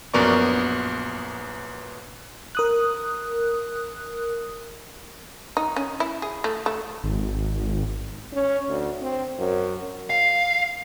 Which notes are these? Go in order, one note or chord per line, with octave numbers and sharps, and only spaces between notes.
A#1 F#2 B3 A#4 D5 C#6
A#4 D#6 F#6
D#4
C#4
E4
G#4
A3
A3
G#1
C#4
D2
C4
F#2
F5